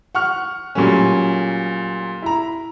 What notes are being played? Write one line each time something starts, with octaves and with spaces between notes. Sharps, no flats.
F#5 C#6 F6
A#2 F#3 G3 A3 C#4
E4 A#5